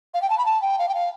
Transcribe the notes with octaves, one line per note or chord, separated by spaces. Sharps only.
F5
G5
A5
B5
A5
G5
F5
G5
F5